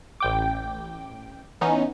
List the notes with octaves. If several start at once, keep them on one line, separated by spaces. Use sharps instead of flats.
A1 G5 D6
E3 B3 C#4 D#4